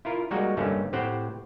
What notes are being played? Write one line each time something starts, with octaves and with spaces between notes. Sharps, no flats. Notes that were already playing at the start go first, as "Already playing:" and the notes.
E4 F4 A#4
G3 G#3 A#3 D#4 F#4
G2 D3 A3 A#3 C#4 D#4
A2 C4 G4 C5 F#5